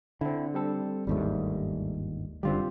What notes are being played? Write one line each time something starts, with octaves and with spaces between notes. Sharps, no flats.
D3 C4 E4
G3 C4 A4
G1 D#2 G#2 G3 A3
F#1 D3 G3 C4 F4 G4